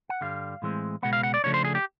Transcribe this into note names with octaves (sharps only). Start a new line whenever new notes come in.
F#5
G2 D3 G3 F5
A2 E3 G#3 C4
C#2 B2 G#3 B3 F#5
F5
F#5
D5
C#3 F3 A3 D4 C#5
C5
G#4
G4